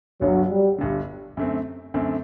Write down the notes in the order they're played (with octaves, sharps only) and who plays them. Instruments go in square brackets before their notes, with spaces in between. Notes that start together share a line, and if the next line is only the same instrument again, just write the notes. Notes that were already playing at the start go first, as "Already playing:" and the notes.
[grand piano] G1 G2 D3 [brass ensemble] F#3
[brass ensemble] G3
[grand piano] G1 G2 D3
F#2 D3 A3 C4
F#2 D3 A3 C4